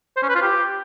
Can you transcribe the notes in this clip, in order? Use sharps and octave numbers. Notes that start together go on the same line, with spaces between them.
C5
C#4
B4
F4
G4